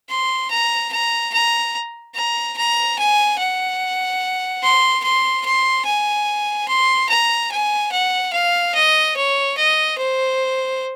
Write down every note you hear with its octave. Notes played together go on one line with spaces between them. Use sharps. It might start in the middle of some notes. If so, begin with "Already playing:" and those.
C6
A#5
A#5
A#5
A#5
A#5
G#5
F#5
C6
C6
C6
G#5
C6
A#5
G#5
F#5
F5
D#5
C#5
D#5
C5